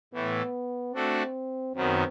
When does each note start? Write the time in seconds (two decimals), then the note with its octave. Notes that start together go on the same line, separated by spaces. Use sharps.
0.13 A2 E3 A3 B3
0.94 A3 C4 D4 F#4 A4
1.75 F#2 D#3 F#3 B3 C4